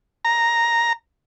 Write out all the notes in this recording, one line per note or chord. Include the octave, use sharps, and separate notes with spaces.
A#5